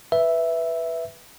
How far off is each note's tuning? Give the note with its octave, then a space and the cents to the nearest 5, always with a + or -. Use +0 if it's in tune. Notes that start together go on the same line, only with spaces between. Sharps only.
B4 +0 E5 +0